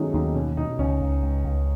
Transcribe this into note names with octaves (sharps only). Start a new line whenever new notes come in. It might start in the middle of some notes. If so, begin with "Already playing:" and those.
Already playing: D#3 F#3 G#3 A3 B3 C#4 D#4
D#2 D#4
B2 C#4
B2 D#4
C#2 C#4
C#2
C#2
C#2